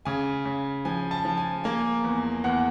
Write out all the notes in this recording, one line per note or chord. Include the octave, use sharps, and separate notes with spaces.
C#3 G#5
C#3
F3 G#5
A5
F3
G#5
A#3 G#5
E2
E2 F#5